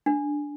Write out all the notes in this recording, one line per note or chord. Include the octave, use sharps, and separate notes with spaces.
D4